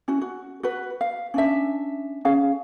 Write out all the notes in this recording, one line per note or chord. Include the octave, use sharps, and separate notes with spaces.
C#4 E4 F#4
F#4
F#4 B4
F5
C#4 D4 E5
C#4 G#4 F5